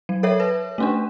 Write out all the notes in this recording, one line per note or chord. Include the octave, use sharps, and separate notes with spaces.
F#3
A4 A#4 C#5 E5
B4
A3 C#4 D4